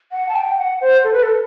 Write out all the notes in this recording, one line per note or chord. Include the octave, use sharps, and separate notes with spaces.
F#5
A5
G5
F#5
C5
A4
B4
A4